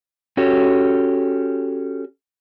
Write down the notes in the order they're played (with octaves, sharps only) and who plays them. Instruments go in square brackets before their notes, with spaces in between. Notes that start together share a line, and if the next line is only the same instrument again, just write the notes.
[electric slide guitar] C#4 F#4 G4 A4 C#5